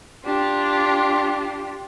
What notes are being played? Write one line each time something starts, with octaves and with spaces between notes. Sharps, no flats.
D4 F4 G4